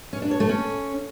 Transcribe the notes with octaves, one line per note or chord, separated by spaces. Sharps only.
C#4
D4
C#5
A3
C#4